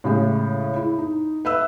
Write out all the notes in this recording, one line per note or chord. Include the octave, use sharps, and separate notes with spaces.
A2 C#3 G#3 G4
E4
D#4
B4 E5 E6